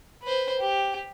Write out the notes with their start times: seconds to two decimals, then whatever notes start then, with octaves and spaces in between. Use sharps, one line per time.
0.23 B4 C5
0.59 G4